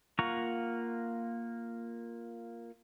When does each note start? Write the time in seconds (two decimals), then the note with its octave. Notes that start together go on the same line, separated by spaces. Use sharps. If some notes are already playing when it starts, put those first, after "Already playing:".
0.19 A#3 F4 F#5 A#5 C#6